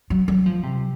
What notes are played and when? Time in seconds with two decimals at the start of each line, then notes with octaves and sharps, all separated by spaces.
0.10 F#3
0.28 F#3
0.46 F3
0.63 C3